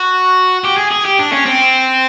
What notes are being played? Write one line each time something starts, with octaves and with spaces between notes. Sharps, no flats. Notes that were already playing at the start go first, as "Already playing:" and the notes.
Already playing: F#4
G4
G#4
G#4
G4
D4
C#4
C4